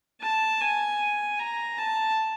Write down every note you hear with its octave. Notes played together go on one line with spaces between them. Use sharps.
A5
G#5
A#5
A5